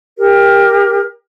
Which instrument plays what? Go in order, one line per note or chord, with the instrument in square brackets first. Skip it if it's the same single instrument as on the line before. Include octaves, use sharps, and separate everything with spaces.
[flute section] G4 A#4